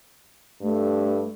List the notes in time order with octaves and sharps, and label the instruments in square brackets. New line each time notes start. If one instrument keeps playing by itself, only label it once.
[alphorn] G2 [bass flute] A3